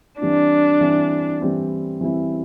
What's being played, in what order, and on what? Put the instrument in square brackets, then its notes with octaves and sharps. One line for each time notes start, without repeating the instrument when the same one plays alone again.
[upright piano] E3 G3 C4 E4 [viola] D4
[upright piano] E3 G3 C4 E4
E3 G3 C4 E4
E3 G3 C4 E4